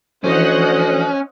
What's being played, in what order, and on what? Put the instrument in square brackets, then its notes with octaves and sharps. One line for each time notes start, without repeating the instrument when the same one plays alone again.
[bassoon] D2 [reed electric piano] E3 F3 [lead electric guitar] C#4 [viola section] C5 D#5 F#5